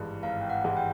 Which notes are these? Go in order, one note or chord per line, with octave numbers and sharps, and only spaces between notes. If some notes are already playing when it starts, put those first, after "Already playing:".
Already playing: G#1 G2 E3 G#3
G#1 F5
G5
F#5
G2 E3 G#3
G5